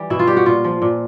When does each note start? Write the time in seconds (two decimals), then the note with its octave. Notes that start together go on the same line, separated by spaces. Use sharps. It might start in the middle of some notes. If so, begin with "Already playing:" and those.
Already playing: E3 G3
0.10 B2 E4
0.19 F4
0.27 G3 G4
0.37 F#4
0.46 A#2 F4
0.64 F3
0.82 A#2